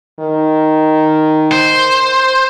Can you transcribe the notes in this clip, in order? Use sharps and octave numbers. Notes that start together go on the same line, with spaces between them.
D#3
C5